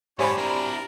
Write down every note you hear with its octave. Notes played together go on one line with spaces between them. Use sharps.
G#2 G3 D4 G4 C5 C#5 G#5 B5
D4 E4 A#4